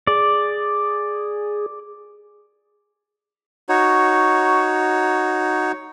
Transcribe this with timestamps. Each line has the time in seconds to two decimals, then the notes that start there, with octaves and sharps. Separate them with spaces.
0.07 G#4 D5
3.69 D#4 F#4 C#5